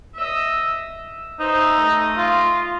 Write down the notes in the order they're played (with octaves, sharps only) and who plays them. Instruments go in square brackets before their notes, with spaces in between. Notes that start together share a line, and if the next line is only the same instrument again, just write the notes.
[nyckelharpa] D#5 E5
E5
[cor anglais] D#4 [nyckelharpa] C5 E5
[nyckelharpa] A3 D#5
[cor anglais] F4